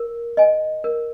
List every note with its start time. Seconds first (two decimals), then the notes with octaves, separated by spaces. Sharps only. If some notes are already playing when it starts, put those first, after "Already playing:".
Already playing: A#4
0.37 D#5 G#5
0.84 A#4